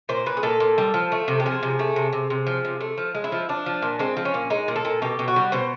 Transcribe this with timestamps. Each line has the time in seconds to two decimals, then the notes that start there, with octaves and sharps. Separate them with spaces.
0.09 A#2 C5
0.26 A#2 B4
0.37 G#4
0.43 A#2 A4
0.60 A#2
0.78 G3
0.94 F3
1.12 A3
1.28 C3
1.40 G4
1.46 F3 G#4
1.63 C3
1.79 A3
1.96 C3
2.13 C3
2.30 C3
2.47 F3
2.65 C3
2.81 A3
2.98 F3
3.15 G#3
3.24 E4
3.32 F3
3.49 F3 D4
3.66 F3
3.82 A#2
3.99 G#3 C4
4.17 F3
4.25 C#4
4.34 A#2
4.50 G#3 D#4
4.68 A#2
4.76 A4
4.85 A#2
5.02 B2 G4
5.19 B2
5.28 F#4
5.36 G3
5.52 B2 C5